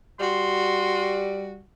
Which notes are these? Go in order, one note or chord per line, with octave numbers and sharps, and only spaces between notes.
G3 F#4 C6